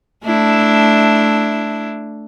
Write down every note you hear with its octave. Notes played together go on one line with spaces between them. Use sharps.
A3 D4 E4